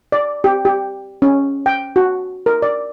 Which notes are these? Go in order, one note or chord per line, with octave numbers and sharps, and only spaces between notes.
D5
G4
G4
C#4
G5
F#4
A#4
D5